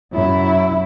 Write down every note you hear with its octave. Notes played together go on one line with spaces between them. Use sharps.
F#2 E4